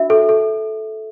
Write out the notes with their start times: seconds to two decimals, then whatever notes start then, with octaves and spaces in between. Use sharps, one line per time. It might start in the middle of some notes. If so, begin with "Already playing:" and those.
Already playing: D4 F#4 E5
0.10 A4
0.29 A4